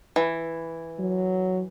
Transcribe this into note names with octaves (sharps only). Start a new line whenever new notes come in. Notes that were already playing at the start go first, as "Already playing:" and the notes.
E3
F#3